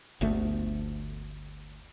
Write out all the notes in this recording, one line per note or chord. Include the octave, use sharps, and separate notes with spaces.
G1 D2 A3